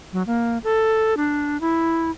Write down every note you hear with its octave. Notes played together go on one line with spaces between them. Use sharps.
F#3
A#3
A4
D4
E4